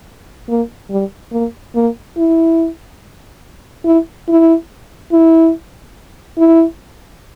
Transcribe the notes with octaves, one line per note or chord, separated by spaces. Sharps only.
A#3
G3
A#3
A#3
E4
E4
E4
E4
E4